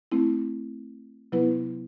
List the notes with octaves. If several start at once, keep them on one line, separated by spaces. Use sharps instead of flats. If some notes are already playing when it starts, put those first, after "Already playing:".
A3 C4 E4
C3 F#3 B3 E4 B4